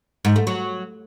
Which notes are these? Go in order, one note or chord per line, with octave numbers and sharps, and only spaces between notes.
G#2
A3
F#3